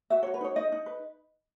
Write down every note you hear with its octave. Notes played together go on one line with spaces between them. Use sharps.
F#4 E5
F#4 C#5
B4
D#4 C#5
D#4 D#5
D#4
B4